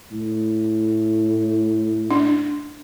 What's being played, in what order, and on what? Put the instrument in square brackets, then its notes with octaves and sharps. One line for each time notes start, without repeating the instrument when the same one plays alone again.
[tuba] A2
[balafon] D4